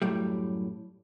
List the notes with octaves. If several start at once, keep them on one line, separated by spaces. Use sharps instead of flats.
F#2 A2 G3